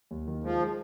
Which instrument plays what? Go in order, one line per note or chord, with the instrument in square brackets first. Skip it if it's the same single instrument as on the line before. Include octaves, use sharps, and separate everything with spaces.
[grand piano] D#2
D#3
[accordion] F3 [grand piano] G#3
[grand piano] G#3